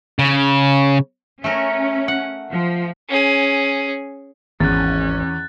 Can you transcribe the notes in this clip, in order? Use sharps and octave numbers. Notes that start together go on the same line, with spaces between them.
C#3
A3 C#4 A#4
F#5
F3
C#4 G#4
G#1 E2 C#4 F#6 A6